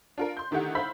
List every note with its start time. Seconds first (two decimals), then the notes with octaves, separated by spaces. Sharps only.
0.18 D4 F4 A#4
0.37 C6 G6
0.51 D3 D#3 A3 E4 G4 F#5
0.75 C5 E5 F5 B5 G6 B6